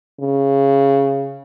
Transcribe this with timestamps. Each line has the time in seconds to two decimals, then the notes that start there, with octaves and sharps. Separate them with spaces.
0.20 C#3